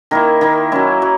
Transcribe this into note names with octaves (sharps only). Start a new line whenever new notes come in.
D#3 A#3 E4 A#4
D#3 A#3 E4
F#3 C#4 E4
F#3